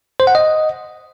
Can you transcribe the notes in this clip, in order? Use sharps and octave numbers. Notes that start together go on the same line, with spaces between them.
C5
F#5
D#5